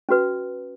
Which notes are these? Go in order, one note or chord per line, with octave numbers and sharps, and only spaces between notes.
C#4 F#4 B4